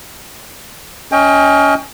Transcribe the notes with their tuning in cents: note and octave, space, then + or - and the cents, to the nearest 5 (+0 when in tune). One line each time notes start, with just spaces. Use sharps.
C#4 +20 D#5 +30 G5 +30